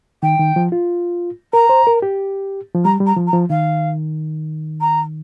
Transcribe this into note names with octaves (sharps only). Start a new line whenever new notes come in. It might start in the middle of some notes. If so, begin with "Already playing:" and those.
D#3 G5
D#3
F3
F4
A#4 A#5
C5
A#4
G4
F3
G3 A#5
G3
A#5
F3
A#5
F3
D#3 F5
A#5